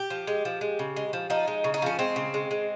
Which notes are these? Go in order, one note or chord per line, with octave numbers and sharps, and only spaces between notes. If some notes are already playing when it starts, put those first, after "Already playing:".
Already playing: G4
F3
G#3
F3
G#3
C#3
G#3
F3
F3 D#4
G#3
C#3
D#4
F3 C#4
G#3 C4
C#3
G#3
G#3